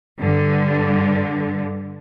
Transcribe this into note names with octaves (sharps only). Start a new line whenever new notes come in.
G2 D3